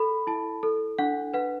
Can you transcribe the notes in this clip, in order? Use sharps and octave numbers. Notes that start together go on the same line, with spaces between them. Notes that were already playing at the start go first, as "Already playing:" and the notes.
Already playing: A4 B5
E4 A5
A4
D4 F#5
B4 F#5